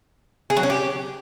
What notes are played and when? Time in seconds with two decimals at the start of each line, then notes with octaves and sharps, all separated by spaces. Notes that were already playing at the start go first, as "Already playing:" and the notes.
0.50 G#4
0.57 F#3
0.63 C#4
0.70 G4